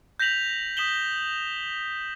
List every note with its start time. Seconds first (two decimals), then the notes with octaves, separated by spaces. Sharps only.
0.19 G6 A#6 B6 F7 F#7
0.77 D#6 B6 E7 F#7 G7